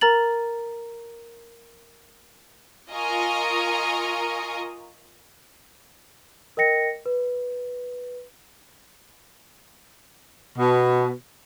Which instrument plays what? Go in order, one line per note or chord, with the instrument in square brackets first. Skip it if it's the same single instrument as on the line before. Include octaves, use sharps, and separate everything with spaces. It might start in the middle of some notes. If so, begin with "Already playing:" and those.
[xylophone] A#4 A#5 A6 F#7
[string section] F4 A#4 D#5 G#5 A#5 C#6
[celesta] A#4 D#5 G5 A#6 C#7
B4
[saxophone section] B2